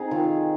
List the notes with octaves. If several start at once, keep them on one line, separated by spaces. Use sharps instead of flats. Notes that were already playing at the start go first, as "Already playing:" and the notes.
Already playing: C4 D#4 G#4
D#3 F4